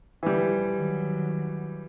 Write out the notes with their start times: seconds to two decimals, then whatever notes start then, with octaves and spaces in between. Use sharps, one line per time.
0.23 D3 E3 F3 G3
0.72 D#3 F#3